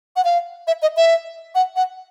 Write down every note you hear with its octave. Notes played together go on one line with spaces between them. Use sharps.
F#5
F5
E5
D#5
E5
F#5
F#5